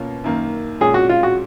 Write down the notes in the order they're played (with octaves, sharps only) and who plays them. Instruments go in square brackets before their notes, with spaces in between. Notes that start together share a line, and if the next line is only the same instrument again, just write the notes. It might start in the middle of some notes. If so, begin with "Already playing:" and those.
Already playing: [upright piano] B2 A#3 C#4 F4
F#2 D#3 A#3
[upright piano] A#2 G#3 C#4 [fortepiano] G#4
[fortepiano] F#4
F4
F#4